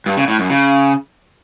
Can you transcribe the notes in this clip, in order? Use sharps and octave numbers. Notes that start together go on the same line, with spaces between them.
G2
C#3
A2
F#2
C#3